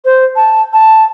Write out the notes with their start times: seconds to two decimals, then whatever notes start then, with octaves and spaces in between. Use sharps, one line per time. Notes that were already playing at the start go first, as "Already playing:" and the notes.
0.05 C5
0.36 A5
0.73 A5